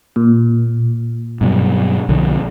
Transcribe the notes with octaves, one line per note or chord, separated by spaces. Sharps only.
A#2
G2 B2 F#3
B1 D3 F3